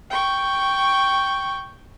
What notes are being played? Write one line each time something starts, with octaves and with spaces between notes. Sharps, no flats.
G5 C#6